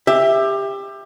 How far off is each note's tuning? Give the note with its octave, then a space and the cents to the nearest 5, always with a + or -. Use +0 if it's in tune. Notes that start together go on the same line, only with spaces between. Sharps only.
G4 +20 E5 +5